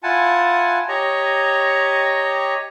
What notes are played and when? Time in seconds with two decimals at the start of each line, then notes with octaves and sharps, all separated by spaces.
0.03 E4 F4 F#5 G#5 A5
0.88 G4 C#5 D#5 A#5 C#6